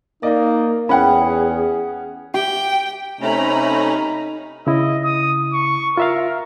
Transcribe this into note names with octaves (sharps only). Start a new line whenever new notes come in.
A#3 D#4 D5 D#5
E2 C#4 G#4 F#5 G5 B5
G4 G5
C3 A3 C#4 D#4 A#5 B5
C#3 E4 D#5
D#6
C#6
F4 A#4 E5 F5